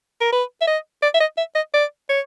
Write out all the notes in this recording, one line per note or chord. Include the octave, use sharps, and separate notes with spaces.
A#4
B4
E5
D#5
D5
E5
D#5
E5
D#5
D5
C#5